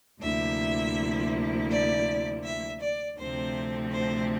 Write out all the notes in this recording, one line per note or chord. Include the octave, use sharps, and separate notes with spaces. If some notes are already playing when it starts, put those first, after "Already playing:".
D2 C3 F3 A#3 E4 E5
D5
E5
D5
D2 C3 F3 A3 C4 C5
C5